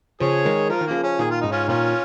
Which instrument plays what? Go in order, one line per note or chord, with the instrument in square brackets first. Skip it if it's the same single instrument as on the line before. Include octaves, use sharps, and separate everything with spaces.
[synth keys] C#3 F3 [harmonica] G#4 C#5
[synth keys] D#3 G#3
[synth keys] F3 [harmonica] F4 A#4
[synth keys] D#3
[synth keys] C#3 F3 [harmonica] A#3
[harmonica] C#4
[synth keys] A#2 D#3 [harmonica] G#4
[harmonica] F4
[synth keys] G#2 C#3 [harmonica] D#4
[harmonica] C#4 F4
[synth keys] A#2 D#3 [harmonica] C#4 F4